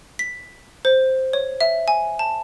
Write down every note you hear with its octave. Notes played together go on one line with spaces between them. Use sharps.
B6
C5
C#5
E5
G#5
A5